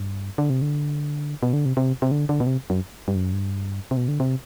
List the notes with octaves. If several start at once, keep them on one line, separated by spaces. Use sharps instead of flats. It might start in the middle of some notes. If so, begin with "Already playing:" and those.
Already playing: G2
D3
C3
D3
B2
D3
C3
C3
C3
D3
D3
B2
C3
F#2
G2
F#2
G2
C3
B2
D3
C3